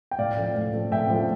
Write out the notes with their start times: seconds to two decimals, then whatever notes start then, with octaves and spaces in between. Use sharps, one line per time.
0.11 G5
0.18 A2 D5 F5
0.37 F3 A3
0.55 A2
0.74 F3 A3
0.91 A2 E5 G5
1.10 F3 A3